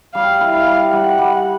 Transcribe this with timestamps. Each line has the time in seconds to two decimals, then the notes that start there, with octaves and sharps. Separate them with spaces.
0.15 G3 F5
0.41 E4
0.53 F5
0.67 G3
0.92 G3 F#5
1.18 G3